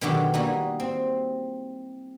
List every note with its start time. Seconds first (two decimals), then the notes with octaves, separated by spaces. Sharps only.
0.01 B2 D3 D#3 F#3 F#4 G4
0.34 G3 A#3 D#4 E4 F#4 D#5
0.80 C4